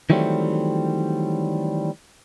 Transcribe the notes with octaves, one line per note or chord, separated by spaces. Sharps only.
D#3 E3 F#3 G3 A3 C4